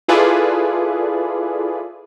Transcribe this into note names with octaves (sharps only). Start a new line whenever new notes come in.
E4 F4 G#4 A4 B4 D5